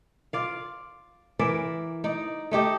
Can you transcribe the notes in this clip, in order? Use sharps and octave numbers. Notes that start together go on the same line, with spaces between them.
F4 D5 F5
E3 A#4 D5 E5
D#4 D5
A3 D#4 G4 A4